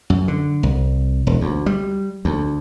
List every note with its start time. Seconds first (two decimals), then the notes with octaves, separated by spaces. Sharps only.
0.10 F#2
0.28 D3
0.63 C2
1.27 E1
1.41 D2
1.66 G3
2.25 D2